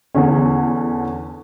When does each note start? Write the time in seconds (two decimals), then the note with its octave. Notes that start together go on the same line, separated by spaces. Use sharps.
0.15 E2 D3 C#4